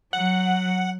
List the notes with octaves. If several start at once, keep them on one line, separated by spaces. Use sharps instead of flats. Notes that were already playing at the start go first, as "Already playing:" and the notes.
F#3 F#5